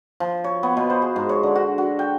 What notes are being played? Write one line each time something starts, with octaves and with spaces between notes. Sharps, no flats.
F3
C#5
B3
B2
C5
G#4
G#2
C#5
D3
F#4
F#4
G5